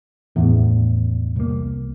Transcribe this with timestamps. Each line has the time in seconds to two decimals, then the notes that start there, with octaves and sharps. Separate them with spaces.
0.36 A1 E2 A2
1.36 C2 A#3